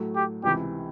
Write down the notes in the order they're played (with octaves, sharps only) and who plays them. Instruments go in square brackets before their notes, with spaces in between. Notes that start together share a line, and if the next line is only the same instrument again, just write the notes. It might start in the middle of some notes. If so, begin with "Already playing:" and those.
Already playing: [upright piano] A2 F#3 A3
[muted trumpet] G4
[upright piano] C#2 C3 E3 [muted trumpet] G4